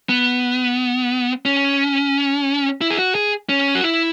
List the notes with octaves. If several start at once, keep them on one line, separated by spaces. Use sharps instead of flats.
B3
C#4
E4
G#4
F#4
G#4
C#4
F#4
E4